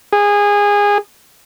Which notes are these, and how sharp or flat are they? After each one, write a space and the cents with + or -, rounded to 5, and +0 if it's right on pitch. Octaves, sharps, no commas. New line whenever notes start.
G#4 -20